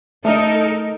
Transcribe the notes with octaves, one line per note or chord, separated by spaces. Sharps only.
A3 D#4 A4 A#4 D#5